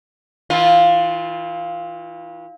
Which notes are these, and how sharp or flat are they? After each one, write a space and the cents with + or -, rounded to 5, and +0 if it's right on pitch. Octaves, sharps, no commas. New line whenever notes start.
E3 -35 F4 +0